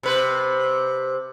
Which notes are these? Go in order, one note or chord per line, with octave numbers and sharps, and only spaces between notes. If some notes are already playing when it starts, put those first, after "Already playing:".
C3 B4 C5